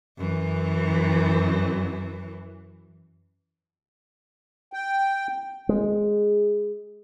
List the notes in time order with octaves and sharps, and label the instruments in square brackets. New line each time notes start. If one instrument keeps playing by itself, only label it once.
[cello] F#2 E3
[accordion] G5
[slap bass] G#3